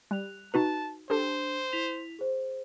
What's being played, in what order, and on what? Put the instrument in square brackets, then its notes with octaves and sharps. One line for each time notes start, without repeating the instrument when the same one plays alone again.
[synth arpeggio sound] G3 [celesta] F#6 F7
[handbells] D#4 F#4 B4 [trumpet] A5
[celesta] D4 [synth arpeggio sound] G4 A4 [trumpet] C5
[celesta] E4 B6 F7
G#4 C5